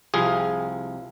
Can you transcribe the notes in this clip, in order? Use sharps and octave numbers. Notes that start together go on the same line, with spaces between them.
C2 C3 F3 G#4